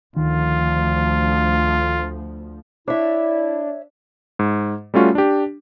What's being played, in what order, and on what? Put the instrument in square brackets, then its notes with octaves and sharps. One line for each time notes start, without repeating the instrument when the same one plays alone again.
[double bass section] D2 F3 [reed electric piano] D#3 [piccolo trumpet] F4
[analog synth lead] D4 [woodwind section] E4 [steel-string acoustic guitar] C#5 E5
[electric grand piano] G#2
G3 A3 C#4 F4 F#4
D4 G4